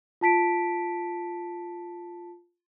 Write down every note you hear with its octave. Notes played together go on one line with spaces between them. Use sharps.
F4 A5 B6 D7